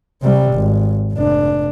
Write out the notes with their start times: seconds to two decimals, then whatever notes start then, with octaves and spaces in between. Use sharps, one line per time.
0.22 C3 G3
0.55 G#1
1.14 F1 D4